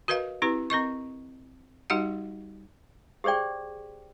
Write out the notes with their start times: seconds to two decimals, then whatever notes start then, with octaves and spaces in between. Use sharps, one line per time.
0.08 F#4 A#4 B4 D#5 F5
0.42 C4 E4 G4 B4
0.70 C4 A#4 D#5 C#6
1.90 G3 D#4 F#4 G4 D#5 F#5
3.24 G4 G#4 C5 D5 G5